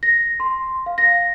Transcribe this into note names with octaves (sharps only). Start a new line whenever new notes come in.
A#6
C6
F5
A#6